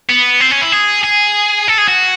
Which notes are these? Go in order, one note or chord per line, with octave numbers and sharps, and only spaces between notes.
B3
C4
C#4
E4
G#4
G#4
A4
G#4
F#4